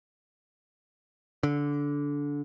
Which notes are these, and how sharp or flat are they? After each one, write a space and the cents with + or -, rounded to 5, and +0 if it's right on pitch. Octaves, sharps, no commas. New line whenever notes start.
D3 -20